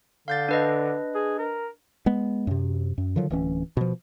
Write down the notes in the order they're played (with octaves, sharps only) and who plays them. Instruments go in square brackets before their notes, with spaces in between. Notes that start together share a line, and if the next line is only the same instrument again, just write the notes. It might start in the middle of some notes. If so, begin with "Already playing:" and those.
[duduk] D3 [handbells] F5 G6 A6
[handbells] D4 B4 D#5
[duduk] G#4
A#4
[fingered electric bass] G#3 B3
F#2 C3
F#2
D3 D#3 F3 F#3
D1 E3 C#4
B2 F3